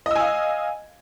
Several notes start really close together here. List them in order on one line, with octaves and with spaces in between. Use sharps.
D#5 E6 G#5 F5